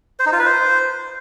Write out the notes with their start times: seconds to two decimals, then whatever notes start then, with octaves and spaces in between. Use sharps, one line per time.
0.19 C5
0.26 D#4
0.33 F4
0.39 B4
0.46 C5